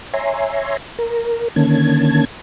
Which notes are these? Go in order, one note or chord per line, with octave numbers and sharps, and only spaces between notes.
C#5 E5 G#5 A#5 C6
A#4
D3 D#3 A#3 C#4 A5 G#6